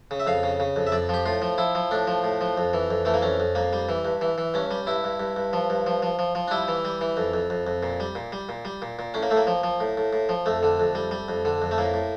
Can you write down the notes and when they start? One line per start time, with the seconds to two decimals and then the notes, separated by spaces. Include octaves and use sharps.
0.11 C#3
0.20 E5
0.27 F2 F5
0.43 C#3
0.60 C#3
0.76 F2
0.87 E5
0.92 F2 D5
1.09 F3 G4
1.26 A2 F4
1.42 F3
1.58 F3 E4
1.75 F3
1.91 A2 D4
2.07 F3
2.24 A2
2.41 F3
2.57 F2
2.73 E3
2.90 F2
3.05 E3 A3
3.14 A#3
3.22 F2 C#4
3.40 F2
3.55 F2 A#3
3.73 G3
3.89 E3
4.05 G2
4.21 E3
4.38 E3
4.54 G2 C#4
4.71 G3
4.87 G2 E4
5.04 G2
5.19 G2
5.36 G2
5.53 F3
5.70 G2
5.86 F3
6.02 F3
6.19 F3
6.35 F3
6.48 D4
6.51 G3 E4
6.68 E3
6.85 G3
7.01 E3
7.17 F2
7.33 F2
7.50 F2
7.67 F2
7.83 A#2
8.00 G3
8.15 A#2
8.32 G3
8.49 A#2
8.65 G3
8.82 A#2
8.99 A#2
9.14 A2 C#4
9.23 A#3
9.31 A2 A3
9.37 A#3
9.47 F3
9.63 F3
9.80 A2
9.97 A2
10.13 A2
10.29 F3
10.46 F2 A3
10.63 D3
10.80 F2
10.95 G3
11.11 G3
11.28 F2
11.45 D3
11.62 F2
11.71 A3
11.78 A2 A#3
11.94 A2